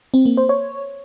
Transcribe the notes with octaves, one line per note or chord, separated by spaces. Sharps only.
C4
A#3
C5
C#5